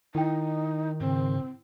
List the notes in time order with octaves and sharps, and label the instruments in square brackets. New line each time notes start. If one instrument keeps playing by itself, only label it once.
[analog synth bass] D#3 [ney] D#4 [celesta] E4 G5
[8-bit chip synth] G#2 C#3 [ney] C4